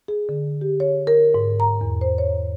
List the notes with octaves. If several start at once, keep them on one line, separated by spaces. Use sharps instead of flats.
G#4
D3
G4
C#5
A#4
G#2
A#5
E2
C5
C#5